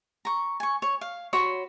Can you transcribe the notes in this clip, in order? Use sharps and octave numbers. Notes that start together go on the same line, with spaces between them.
A#5 C#6
G#5 C#6
C#5
F5
F#4 C#5 B5 C6